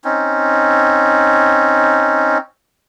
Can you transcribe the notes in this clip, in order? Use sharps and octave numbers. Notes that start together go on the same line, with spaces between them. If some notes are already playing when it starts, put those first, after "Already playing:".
C4 C#4 D#4